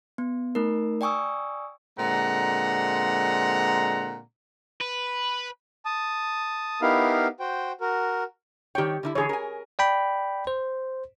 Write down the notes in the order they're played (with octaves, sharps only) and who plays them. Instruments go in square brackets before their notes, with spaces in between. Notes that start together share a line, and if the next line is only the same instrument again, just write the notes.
[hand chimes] B3
A3 D#4 A#4
D5 G5 G#5 C#6 D#6 E6
[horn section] A#2 D3 G#3 C4 F#5 A#5
[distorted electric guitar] B4
[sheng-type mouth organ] A5 D#6
B3 D#4 E4 G4 A#4 F5
F#4 C5 G5
F#4 A#4
[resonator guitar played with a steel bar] D#3 C#5 [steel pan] G4 G5
[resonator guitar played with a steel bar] D3 G3 E4
[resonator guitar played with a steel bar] D3 E3 [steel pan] G#4 C#5
[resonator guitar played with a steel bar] A#4 G#5
[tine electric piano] D5 G5 B5
C5